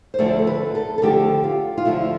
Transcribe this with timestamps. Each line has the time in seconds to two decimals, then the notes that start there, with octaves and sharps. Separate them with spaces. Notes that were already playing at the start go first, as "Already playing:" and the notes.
0.14 C5
0.18 D2 D3 F3 A3 D5
0.39 A4
0.47 B4
0.75 A4
0.98 A4
1.02 D2 D3 F3 A3 G4
1.44 F4
1.78 F4
1.85 D2 D3 F3 A3 E4